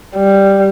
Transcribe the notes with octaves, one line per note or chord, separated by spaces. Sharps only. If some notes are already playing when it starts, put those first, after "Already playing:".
G3